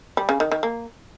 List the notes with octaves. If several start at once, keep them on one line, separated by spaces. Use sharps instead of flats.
G3
C#3
D#3
D#3
A#3